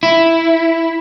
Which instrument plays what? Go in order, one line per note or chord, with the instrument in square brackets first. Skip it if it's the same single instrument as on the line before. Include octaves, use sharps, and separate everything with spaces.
[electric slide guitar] E4